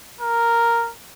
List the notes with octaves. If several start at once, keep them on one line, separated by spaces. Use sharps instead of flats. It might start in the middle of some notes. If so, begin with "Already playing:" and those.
A#4